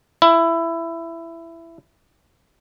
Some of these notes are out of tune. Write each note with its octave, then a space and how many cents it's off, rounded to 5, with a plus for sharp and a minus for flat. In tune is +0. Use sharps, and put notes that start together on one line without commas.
E4 +15